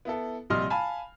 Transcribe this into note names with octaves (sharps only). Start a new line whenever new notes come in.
B3 E4 A4
A#1 C3 G3 D#5 C6 F6
F5 G#5 A5 B5